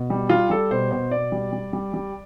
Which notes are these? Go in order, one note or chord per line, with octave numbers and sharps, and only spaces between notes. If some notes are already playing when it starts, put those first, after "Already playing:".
Already playing: B2
G3
G3 F4
G3 A4
B2 C5
B2 C5
B2 D5
G3
G3
G3
G3